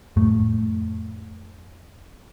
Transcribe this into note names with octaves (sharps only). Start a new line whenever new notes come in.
F2 A2 A3